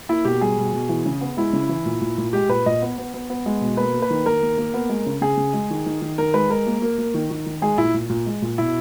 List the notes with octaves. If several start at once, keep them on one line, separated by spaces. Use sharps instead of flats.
A#3 E4
B2 G4
G3 G#4
B2
B2
E3
C#3
B3
G#3 E4
C#3
E3
A#2
A#2
A#2
G#3 G4
A#2 B4
A#2 D#5
B3
B3
B3
B3
G#3
B2
A#3 B4
A#3
B4
D#3
D#3 A#4
A#3
A#3
B3
G#3
C#3
C#3 G#4
C#3
G#3
D#3
D#3
D#3
D#3 A#4
G#3 B4
G#3 A#4
A#3
A#3
A#3
D#3
D#3
D#3
G#3 G#4
A#2 E4
A#2
A#2
G#3
A#2
B2 E4